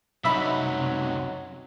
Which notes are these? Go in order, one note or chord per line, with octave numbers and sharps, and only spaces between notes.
C2 F#2 C3 F#3 D#4 E5 B5